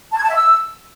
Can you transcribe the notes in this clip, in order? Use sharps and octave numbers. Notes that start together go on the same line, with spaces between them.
A5
G#6
A5
E5
E6